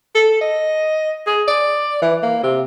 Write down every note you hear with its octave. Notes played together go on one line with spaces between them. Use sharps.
A4
D#5
G#4
D5
E3
A#3
C3